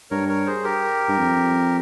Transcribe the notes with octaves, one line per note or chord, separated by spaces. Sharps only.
G2 A#4 C#5
A#4 C#5
G#4 C5
G4 A#4
G2
F2